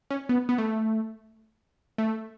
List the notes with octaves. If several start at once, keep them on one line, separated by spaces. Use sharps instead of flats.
C#4
B3
B3
A3
A3